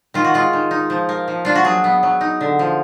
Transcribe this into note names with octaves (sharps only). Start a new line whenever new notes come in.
D#3 F4
F#4
G#3 F4
D#3
D#4
F3
A#3
F3
D4 F4
F#4
F#3 G#4
B3
F#3
D#4
D3
F3